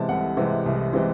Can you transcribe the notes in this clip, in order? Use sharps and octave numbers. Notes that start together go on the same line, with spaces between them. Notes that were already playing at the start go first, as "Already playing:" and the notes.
Already playing: C3 E3 G#3 A5
C2 F#5
C3 E3 G#3
C2
C3 E3 G#3